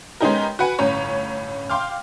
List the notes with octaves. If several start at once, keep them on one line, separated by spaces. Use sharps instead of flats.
G#3 B3 C#4 D#4 G4 A#4
F#4 B4 F#5 G#5
G1 A2 C#4 C#5 A#5
F5 G5 C6 D6 F6